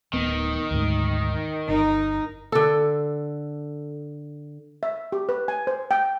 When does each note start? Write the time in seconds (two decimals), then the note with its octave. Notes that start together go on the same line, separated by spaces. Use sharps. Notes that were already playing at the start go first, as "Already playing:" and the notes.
0.13 D1 D#3 B3
0.71 D2 G#2
1.68 G1 D#4 A#4
2.52 D3 A4
4.83 E5
5.12 G4
5.29 B4
5.48 G#5
5.67 C5
5.91 G5